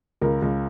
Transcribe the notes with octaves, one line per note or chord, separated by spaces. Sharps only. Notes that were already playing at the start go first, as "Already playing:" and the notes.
C#2 A#4
C#2